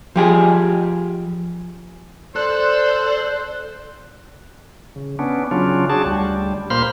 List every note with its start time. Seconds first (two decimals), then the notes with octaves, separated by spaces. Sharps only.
0.16 F3 G4 G#4
2.36 A4 C5 D5 F#6
4.96 C#3
5.19 B3 C#4 D4
5.51 C#3 F#3 C#4 D4 F4
5.89 D4 F#4 G#4 A5
6.05 D2 G3
6.70 A#2 A#3 C5 B5 C6 F6